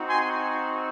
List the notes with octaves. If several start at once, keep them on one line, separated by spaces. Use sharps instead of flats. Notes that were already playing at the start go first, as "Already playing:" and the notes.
Already playing: C4 D#4 F#4
G#5 C6